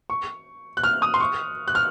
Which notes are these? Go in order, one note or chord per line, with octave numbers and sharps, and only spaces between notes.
C#6
F#6
F6
D#6
C6
C#6
F#6
F6